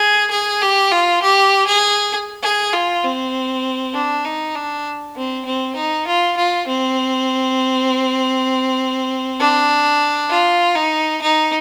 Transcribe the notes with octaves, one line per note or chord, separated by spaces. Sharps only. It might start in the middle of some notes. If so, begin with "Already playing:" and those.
Already playing: G#4
G#4
G4
F4
G4
G#4
G#4
F4
C4
D4
D#4
D4
C4
C4
D#4
F4
F4
C4
D4
F4
D#4
D#4